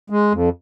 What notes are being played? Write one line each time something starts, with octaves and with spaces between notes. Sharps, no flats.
G#3
F2